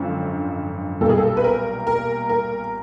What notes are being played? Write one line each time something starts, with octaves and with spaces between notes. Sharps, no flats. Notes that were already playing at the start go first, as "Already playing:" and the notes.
Already playing: G#1 F#2 D3 F3
B1 A#2 G3 A4
G#4
A4
B4
A#4
A#4
A#4